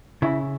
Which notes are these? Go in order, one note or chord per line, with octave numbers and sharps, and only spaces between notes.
C#3 E4